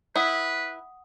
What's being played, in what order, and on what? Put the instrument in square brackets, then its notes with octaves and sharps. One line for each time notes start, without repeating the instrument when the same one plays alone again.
[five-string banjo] E4 [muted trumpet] B4 [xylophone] F#5 D#6